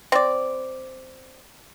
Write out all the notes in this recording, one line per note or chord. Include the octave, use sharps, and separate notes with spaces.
C4 D5